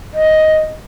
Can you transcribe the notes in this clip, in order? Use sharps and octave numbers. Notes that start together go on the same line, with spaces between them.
D#5